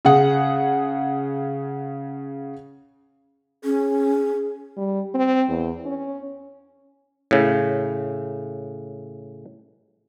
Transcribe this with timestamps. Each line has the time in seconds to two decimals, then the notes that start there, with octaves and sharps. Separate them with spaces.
0.05 C#3 G#4 F#5
3.65 C#4 G#4
4.76 G3
5.14 C4
5.48 E2
5.86 C#4
7.31 A2 C#3